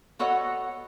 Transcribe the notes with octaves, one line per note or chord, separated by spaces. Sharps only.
B3 F#4 A4 C#5 D#5 F#5